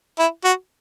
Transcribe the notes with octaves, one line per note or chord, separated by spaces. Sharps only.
E4
F#4